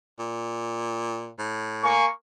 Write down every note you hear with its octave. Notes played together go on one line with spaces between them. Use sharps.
A#2
A2
A#3 G#5 C#6